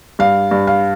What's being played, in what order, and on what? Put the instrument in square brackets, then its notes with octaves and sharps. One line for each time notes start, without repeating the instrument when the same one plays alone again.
[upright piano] G2 [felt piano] F5
[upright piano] G2
[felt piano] F5